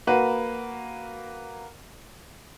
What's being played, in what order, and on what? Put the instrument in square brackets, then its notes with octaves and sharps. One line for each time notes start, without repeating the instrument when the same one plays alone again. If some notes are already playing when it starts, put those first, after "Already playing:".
[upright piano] A#3 F#4 B4